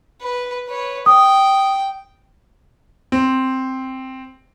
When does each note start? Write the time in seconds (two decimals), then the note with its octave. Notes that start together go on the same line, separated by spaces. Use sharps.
0.22 B4
0.68 B4 C#5
1.06 G5 D#6
3.12 C4